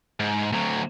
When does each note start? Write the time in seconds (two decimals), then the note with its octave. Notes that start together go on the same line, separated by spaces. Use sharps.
0.20 G#2
0.52 D2 F#3